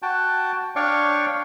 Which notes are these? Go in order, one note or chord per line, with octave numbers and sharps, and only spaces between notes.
F#4 G5 A5
D4 C#5 D5 F5 G5 C#6